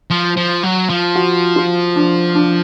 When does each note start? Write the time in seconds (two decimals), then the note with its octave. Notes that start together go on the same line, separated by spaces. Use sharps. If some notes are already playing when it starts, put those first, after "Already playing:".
0.10 F3
0.37 F3
0.63 F#3
0.89 F3
1.15 F#4
1.56 F4
1.96 D4
2.35 D4